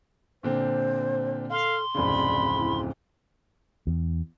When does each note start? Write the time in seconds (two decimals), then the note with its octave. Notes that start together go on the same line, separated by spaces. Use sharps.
0.43 A#2 D3 C4 C5
1.50 A4 F5 C6
1.95 D1 F2 C#3 D5 B5
2.58 E4
3.87 E2